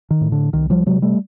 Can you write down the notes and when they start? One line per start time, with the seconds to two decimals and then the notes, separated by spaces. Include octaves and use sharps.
0.11 D#3
0.21 A2
0.32 D3
0.53 C2 D#3
0.70 F3 G3
0.86 C3 F#3 G#3
1.02 G3 A3